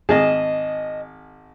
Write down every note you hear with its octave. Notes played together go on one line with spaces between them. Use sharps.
G#1 G#4 D#5 A5